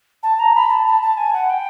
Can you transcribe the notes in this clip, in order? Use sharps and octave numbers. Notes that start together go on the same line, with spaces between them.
A5
A#5
B5
A5
A5
A5
G#5
F#5
G5